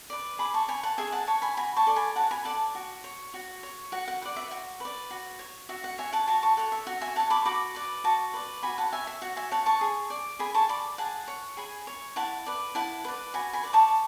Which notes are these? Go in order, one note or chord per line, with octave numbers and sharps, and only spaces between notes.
B4 D5
G#4 B5 D6
A5 C#6
C#5 G#5 B5
F#5 A5
G#4 E5 G#5
F#5 A5
C#5 A5 C#6
G#5 B5
F#4 G#5 B5
A5 C#6
A4 D5
G#5 B5
F#4 F#5 A5
G#5 B5
A4 D5 F#5 A5
F#4
C#5
F#4
C#5
F#4 F#5
F#5
B4 D5 F#5
E5
F#4
B4 D5
F#4
C#5
F#4 E5
F#5
C#5 E5 G#5
F#5 A5
F#4 A5 C#6
A5 C#6
A4 C#5 F#5
E5
F#4 F#5
E5 G#5
A4 C#5 F#5 A5
B5 D6
F#4 B5 D6
B4 D5
F#4 A5 C#6
B4 D5
F#4 G#5 B5
F#5 A5
C#5 E5 G#5
E5
F#4 F#5
E5 G#5
C#5 F#5 A5
A5 C#6
G#4
D5
G#4 G#5 B5
A5 C#6
D5 B5 D6
G#4 F#5 A5
C#5
G#4 G#5 B5
C#5
E4 F#5 A5
B4 D5
E4 F#5 A5
B4 D5
F#4 G#5 B5
G#5 B5
B4 D5
A5 C#6